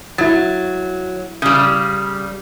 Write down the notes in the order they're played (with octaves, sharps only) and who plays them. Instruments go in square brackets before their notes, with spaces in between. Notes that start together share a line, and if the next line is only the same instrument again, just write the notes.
[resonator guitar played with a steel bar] F#3 [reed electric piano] E4 A6
[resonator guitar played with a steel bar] C#3 G3